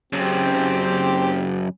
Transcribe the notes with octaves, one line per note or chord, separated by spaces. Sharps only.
F#2 C#3 C4 G4